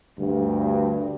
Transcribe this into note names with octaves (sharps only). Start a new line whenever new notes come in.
D2 G2